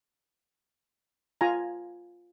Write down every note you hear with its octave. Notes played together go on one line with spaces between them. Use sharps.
F4 G#5 A#5